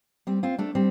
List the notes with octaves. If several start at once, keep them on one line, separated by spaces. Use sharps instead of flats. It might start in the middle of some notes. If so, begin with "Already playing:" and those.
G3 C4
C4 F4
A3 D4
G3 C4